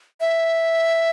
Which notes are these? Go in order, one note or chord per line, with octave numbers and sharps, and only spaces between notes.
E5